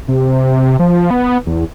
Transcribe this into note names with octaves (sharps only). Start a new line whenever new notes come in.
C3
F3
B3
E2